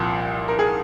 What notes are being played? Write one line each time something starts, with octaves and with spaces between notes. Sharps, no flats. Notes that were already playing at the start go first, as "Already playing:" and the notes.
Already playing: C2 A#2 F3 A#3
A#4
G#4